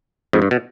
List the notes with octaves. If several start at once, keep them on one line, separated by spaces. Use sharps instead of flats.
F2 G#2
G2
B2